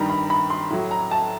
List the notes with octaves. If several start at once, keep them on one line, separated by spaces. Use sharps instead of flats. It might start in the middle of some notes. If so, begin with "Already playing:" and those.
Already playing: G2 D#3 G3 A#5
B5
B5
C6
A2 F#3
A#5
A5